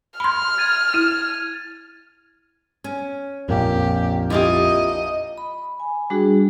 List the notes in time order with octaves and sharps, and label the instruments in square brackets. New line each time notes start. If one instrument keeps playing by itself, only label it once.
[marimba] B5 C6 [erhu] F6
[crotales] G#6 A6 D#7
[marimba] E4 [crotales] D#7
[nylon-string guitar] C#4
[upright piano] A#1 A#3 [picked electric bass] F2 [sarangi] G4
[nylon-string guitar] E4 F4 G4 [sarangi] D#5
[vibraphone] B5
G#5
G3 D4 F#4 G#4